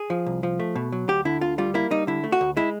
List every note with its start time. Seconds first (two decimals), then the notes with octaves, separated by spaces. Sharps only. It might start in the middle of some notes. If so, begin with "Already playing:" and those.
Already playing: G#4
0.10 F3
0.26 C2
0.43 F3
0.60 A3
0.76 B2
0.92 F#3
1.09 D2 G4
1.25 D3 E4
1.41 D2 F4
1.58 G3 F4
1.74 A#3 E4
1.91 G3 D#4
2.07 D3 E4
2.24 A3
2.32 F#4
2.41 D2
2.57 G#3 E4